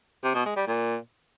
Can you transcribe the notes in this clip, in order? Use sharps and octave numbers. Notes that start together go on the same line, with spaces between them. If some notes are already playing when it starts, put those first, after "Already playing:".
C3
B2
G#3
G3
A#2